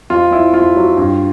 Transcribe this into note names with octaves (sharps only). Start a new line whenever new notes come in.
F2 F4
F2 E4
F2 F4
F#3
G2